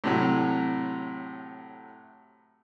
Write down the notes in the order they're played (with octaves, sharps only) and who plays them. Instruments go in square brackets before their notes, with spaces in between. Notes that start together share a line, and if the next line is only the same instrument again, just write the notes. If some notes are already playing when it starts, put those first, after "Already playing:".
[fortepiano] A2 C3 F#3